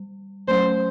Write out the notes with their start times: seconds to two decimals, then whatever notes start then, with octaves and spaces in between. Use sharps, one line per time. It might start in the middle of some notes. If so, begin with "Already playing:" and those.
Already playing: G3
0.48 F#3 A3 C#4 C5